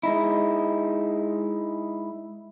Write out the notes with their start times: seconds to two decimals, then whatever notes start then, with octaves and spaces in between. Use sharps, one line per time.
0.03 G#3 D#4 E4